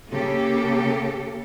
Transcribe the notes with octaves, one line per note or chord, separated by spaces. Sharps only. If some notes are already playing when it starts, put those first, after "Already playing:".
C#3 A#3 G4 A4